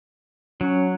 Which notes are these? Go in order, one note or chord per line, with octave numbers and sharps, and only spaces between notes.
F#3 C#4